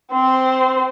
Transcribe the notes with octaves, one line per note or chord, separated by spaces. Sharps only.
C4 C5